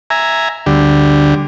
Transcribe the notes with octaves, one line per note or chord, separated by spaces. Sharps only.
E5 G#5 A#5
D2 D3 G3